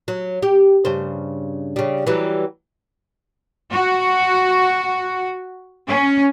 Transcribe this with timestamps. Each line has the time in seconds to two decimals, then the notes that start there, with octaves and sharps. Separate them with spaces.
0.08 F#3
0.42 G4
0.85 G2 C#3 C5
1.76 C#3 G3
2.07 E3 F#3 G3
3.72 F#4
5.88 C#4